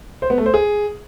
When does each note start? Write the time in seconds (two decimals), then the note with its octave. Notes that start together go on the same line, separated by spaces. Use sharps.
0.22 C5
0.30 B3
0.38 A3
0.46 C5
0.54 G#4